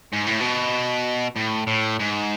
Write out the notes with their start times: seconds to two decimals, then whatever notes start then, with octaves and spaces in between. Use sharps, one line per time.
0.13 G#2
0.27 A2
0.41 B2
1.36 A2
1.67 A2
1.99 G#2